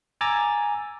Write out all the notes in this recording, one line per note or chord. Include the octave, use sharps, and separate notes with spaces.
G#5 A#5 D6 E6 A6